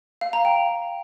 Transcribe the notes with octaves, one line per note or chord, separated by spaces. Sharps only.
F5
A#5
G5